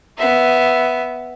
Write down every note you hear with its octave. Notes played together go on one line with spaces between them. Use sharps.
B3 E5